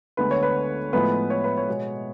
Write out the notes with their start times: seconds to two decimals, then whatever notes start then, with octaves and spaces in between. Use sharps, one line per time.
0.17 D2 D3 G#3 B3 B4
0.31 C#5
0.43 B4
0.93 A2 F3 G#3 B3 B4
1.30 C#5
1.44 B4
1.57 C#5
1.68 B2 G#3 B3